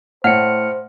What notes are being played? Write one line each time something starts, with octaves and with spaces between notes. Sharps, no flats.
A2 C5 D5 F#5 F6 C#7